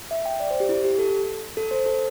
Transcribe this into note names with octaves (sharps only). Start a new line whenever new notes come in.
E5
G5
D5
C5
G4
E4
G4
A4
A4
C5
A4